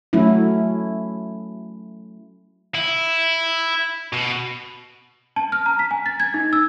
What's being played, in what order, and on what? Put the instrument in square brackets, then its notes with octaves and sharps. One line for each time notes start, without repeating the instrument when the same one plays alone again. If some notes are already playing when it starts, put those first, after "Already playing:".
[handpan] F#3 A3 C#4 E4
[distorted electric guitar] E4
B2
[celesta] A5
F6
A#5
B6
G#5
A6
G#6
D#4
E6